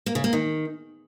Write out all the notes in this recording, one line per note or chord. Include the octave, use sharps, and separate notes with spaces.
A#3
C#3
A#3
D#3